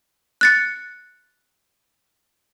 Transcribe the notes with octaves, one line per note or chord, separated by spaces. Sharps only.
F#6 A6 C#7